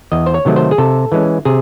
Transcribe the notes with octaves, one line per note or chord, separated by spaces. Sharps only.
E2 D#5
C5
C#5
C3 D#3 F#3 A3
C5
G#4
C3 A4
E3 G#3 C#4
C3 G#4